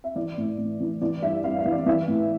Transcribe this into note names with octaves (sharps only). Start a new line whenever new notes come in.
E5
E3 D5
A2
A2
E3
E3 D5
G2 E5
G2 F5
E5
E3
D5
E3 E5
A2